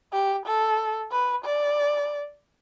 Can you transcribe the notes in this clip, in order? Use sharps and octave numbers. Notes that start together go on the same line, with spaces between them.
G4
A4
B4
D5